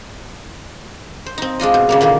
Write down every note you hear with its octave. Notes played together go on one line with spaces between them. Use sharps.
C5
C4 D#4
G#3 D4 F4 D#5
B2
C#3 F#3 A#3
A#2 D3 D#3 A#3